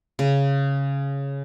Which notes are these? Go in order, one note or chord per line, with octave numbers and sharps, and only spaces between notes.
C#3